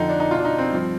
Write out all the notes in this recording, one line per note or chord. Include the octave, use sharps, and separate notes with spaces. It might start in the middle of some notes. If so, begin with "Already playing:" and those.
Already playing: F2 D3 F3 D#4
D4
D#4
B2 F4
D4
D#4
C4
G2 F3